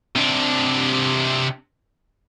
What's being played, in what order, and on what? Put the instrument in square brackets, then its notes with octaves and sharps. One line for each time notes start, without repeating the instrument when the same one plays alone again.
[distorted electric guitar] C3 D4